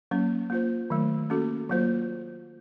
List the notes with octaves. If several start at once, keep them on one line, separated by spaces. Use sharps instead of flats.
F#3 A#3 C#4
A#3 F4 C5
D#3 F#3 A3
A#3 C#4 F#4 A4
F#3 A#3 F4 C5